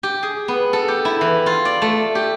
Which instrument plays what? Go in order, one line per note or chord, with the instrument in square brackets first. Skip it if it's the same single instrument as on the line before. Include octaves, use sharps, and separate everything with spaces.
[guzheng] G4
G#4
B3
A4
G4
E4
E3
F4
D5
A3
G4